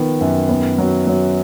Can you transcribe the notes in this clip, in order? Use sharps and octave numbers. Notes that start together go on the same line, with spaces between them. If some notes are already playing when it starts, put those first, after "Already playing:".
Already playing: D#3 F3 B3
F#2
B3
F#3
F#3